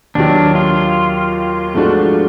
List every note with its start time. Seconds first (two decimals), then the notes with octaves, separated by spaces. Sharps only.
0.15 D#2 D#3 F#3 D4
0.55 F4
1.74 G#2 F3 A3 D4 F#4